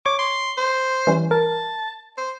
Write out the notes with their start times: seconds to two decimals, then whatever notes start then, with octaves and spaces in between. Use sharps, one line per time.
0.06 C#5 C#6 D6
0.19 C6
0.57 C5
1.07 E3 G3 C#4
1.31 A#4 A5
2.18 C5